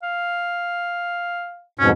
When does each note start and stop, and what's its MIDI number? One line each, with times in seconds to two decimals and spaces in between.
0.03 1.65 77
1.80 1.91 41
1.80 1.91 44
1.80 1.91 47
1.80 1.89 61